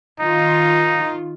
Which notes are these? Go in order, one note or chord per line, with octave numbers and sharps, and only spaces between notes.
D#3 D#4 F4